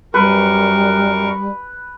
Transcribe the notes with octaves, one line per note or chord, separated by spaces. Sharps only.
F#2 G3 A#4 B4 C#6